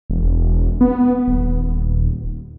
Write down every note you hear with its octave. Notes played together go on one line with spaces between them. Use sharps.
E1
B3
D#1